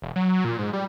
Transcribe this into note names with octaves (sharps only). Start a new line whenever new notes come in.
E1
F#3
A#2
G#2
G3